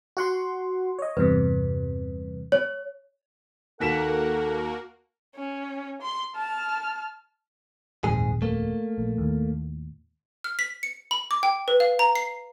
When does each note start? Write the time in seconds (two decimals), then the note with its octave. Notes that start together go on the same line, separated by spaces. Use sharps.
0.17 F#4 F#5 C6
0.99 C#5 D#5
1.17 E2 G2 C3 B4
2.52 C#5
3.80 D#2 A#3 F#4 A4 A#4 F#5 B6 E7
5.36 C#4
6.02 C6
6.36 A5 F6
8.04 D#1 A#1 F2 G#2 G#4
8.42 A3 A#3
8.98 A#1
9.18 D#2 A2
10.44 F6
10.59 B6
10.83 C#7
11.11 B5
11.31 D6
11.43 G5
11.68 B4
11.80 F5
11.99 A#5
12.15 C7